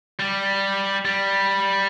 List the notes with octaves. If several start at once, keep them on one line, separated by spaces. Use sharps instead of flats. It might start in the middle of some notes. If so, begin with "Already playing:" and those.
G3
G3